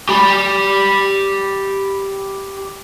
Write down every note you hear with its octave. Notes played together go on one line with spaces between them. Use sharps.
G4 B5